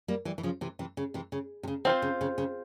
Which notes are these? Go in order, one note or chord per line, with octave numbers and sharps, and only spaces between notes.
G3 A#3
E3 G3
E3
C#3 F3
C3 E3
C3 E3
C#3
C3 E3
C#3
C3
C#3
C3 E3 C4 F4 C5
C#3
C#3
C#3